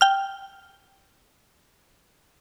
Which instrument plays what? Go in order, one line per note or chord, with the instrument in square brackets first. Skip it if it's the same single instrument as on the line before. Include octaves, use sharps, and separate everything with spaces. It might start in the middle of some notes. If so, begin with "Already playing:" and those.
[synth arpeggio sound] G5 F6